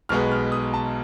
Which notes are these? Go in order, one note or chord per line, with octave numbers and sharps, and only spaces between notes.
B1 B2 G#3 B3 F6
F6
D#6
A5